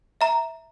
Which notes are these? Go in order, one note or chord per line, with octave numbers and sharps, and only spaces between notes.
E5 A#5